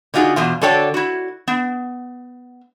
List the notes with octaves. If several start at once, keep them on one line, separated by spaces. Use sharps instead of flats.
D3 D#4 F4 F#4 G#4
E2 B2 F4
D3 F#4 A4 C#5 D5 G5
E4 F#4
B3